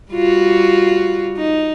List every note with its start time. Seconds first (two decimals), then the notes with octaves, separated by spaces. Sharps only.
0.12 G3 F4 F#4
1.37 D#4